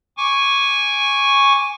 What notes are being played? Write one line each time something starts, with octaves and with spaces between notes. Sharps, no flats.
G#5 C#6 D6